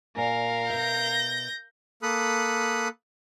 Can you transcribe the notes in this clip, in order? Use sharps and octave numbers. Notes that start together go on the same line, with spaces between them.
A#2 A#4 D5 F5 G#5
B2 E5 G6 A#6
A#3 A4 B5 D#6 F#6